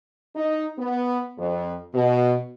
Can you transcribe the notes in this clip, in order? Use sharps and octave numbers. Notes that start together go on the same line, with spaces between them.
D#4
B3
F2
B2